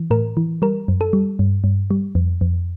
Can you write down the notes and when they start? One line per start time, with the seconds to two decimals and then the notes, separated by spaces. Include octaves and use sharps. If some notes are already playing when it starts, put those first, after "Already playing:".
Already playing: E3
0.10 A2 A#4
0.37 E3
0.62 G3 A#4
0.88 F#2
1.01 A4
1.13 G3
1.39 G2
1.64 G2
1.91 G3
2.15 F2
2.41 F2